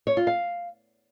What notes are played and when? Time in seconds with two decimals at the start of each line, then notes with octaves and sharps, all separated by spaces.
0.07 C#5
0.17 F4
0.27 F5